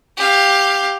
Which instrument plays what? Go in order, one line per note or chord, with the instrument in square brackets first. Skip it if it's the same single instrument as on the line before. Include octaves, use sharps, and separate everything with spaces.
[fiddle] G4 F5